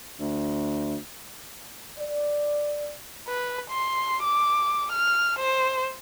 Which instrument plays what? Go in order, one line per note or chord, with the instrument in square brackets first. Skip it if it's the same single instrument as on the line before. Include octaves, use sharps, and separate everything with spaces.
[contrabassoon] D2
[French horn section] D5
[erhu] B4
C6
D6
F6
C5